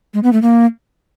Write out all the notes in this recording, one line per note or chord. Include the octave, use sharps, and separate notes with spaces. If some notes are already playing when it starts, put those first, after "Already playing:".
G#3
B3
A3
A#3